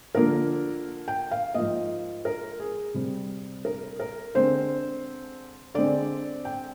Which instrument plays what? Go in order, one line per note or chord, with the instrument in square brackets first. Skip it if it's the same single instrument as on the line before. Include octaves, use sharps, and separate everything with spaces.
[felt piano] D3 F3 A#3 A#4
G5
F5
G#2 F3 A#3 D#5
A#4
G#4
C3 G3 C4
A#4
A#4
D3 G#3 C4 C5
D3 G#3 C4 D5
G5